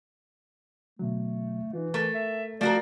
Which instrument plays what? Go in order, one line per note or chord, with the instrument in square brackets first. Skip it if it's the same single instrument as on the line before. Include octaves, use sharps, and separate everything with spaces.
[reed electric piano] B2 D3 F#3 [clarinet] A3
[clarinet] E3 [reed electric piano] D#4 F4
[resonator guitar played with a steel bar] A3 [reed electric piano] A#4
[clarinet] E5
[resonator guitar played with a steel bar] F3 F#4 A#4 [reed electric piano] A3 F4 [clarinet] D5